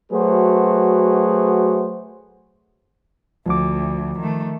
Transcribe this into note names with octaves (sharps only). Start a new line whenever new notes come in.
F#3 A3 F#4 G#4 B4 C5
D2 F3 D6
D#3 A3